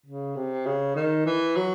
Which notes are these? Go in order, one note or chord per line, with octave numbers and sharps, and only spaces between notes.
C#3
C3
C#3
D#3
E3
F#3